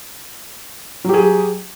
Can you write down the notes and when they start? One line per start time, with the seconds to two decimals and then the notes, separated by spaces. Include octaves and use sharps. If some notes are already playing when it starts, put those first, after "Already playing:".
1.04 F#3
1.09 G4
1.14 G#4